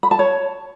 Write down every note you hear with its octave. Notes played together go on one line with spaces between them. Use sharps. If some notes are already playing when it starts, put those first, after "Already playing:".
B5
A5
C#5